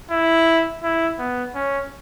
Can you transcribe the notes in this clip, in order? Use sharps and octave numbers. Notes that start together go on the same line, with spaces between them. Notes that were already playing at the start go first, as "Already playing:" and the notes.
E4
E4
B3
C#4